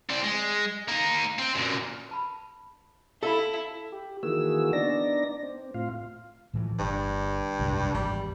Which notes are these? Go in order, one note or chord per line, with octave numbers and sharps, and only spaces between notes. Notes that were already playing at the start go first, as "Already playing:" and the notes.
C4 D5
G#3
A#3 D#4
C4
F#2 A#2
B4 A5 B5
E4 A4 F5 A5 B5
G4
D#3 E3 A#3 F#4 G#4 E6
B3 D4 D#4 D5 A#6
C4
A2 F4 F5
A2 E3 F3
G1 G2
F#1 C2 G#2
G#1 E2 G#2 G3